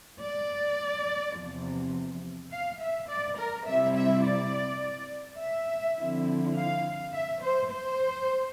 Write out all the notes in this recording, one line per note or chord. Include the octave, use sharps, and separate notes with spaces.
D5
E2 C3 F3
F5
E5
D5
A#4
C3 G3 C4 E4 E5
E5
D5
E5
D3 F3 C4 E4
F5
E5
C5
C5